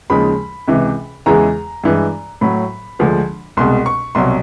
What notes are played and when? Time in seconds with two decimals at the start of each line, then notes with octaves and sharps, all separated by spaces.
0.10 D#2 C#3 F3 G#3 B5
0.68 C#2 C3 E3
1.26 E2 C#3 E3 G#3 A#5
1.84 G2 E3 G#3
2.41 A2 F#3 B5
2.99 D2 D3 F3 G#3
3.57 C2 B2 G#3 C6
3.86 C#6
4.15 C2 B2 F#3 C6